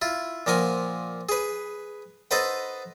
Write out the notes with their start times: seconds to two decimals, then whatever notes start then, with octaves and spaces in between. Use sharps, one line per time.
0.02 E4 F4
0.46 A#2 F3 A#4 F#5 G#5
1.29 G#4 B4
2.31 D#4 A4 B4 C5 F#5